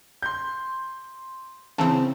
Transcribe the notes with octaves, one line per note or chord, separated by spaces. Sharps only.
C6 G6
C#3 E3 C4 A5